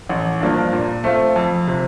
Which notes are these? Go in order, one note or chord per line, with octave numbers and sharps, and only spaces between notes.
A1
G2 F3 A#3 D4
A#2
A3 C4 F4
F2
C3 F3